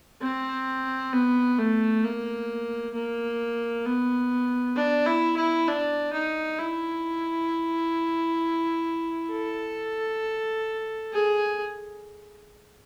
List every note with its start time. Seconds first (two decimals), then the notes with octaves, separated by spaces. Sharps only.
0.22 C4
1.13 B3
1.59 A3
2.04 A#3
2.94 A#3
3.86 B3
4.76 D4
5.06 E4
5.36 E4
5.68 D4
6.13 D#4
6.59 E4
9.31 A4
11.13 G#4